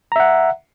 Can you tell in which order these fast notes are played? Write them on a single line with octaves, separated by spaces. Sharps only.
A#5 E5 F#5